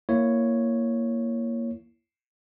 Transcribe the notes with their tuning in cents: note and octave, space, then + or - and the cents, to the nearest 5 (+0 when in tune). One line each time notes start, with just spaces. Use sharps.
A#3 +0 E4 +15 C#5 +0